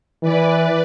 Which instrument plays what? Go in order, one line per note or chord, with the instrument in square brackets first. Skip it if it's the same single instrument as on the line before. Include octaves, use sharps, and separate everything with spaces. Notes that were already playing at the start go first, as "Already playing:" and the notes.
[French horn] E3 [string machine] B4 D5